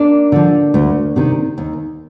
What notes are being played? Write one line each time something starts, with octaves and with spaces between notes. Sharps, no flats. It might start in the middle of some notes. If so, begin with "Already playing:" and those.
Already playing: A#3 D4
D3 F3
D2
C3 D#3
D#2